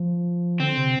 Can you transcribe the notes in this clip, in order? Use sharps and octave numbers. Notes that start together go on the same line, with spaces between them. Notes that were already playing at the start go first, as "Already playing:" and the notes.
Already playing: F3
D3 C4
C3